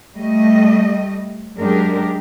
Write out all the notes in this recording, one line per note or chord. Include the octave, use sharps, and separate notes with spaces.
G3 A3 D#5
F#2 G#3 D4 G4 A#4